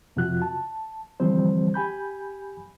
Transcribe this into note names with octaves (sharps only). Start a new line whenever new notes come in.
F2 C3 F3 F4 F#4 F#6
A5
D3 E3 F3 G3 C4 C5
G4 G#5 B5 G6